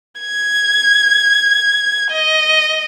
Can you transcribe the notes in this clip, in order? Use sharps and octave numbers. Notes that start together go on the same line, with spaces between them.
G#6
D#5